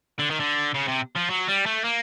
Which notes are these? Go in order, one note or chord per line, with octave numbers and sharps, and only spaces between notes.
D3
D#3
D3
C#3
C3
F3
F#3
G3
A3
A#3